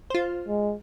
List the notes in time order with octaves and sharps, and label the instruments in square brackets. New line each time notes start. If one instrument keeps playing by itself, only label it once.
[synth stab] F4 C5
[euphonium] G#3